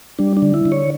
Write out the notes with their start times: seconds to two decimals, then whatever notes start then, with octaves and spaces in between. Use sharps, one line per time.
0.19 G3 D4
0.37 D4
0.42 D3
0.54 E4
0.65 D3
0.72 C#5